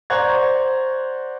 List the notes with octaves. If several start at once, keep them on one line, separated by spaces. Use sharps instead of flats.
C5 D5 F#5 A#5 C#6 G#6